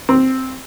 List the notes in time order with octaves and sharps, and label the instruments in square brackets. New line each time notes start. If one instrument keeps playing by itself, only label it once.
[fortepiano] C4